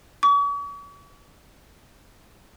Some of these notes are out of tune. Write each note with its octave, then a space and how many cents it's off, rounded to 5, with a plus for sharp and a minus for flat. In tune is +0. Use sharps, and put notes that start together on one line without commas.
C#6 +45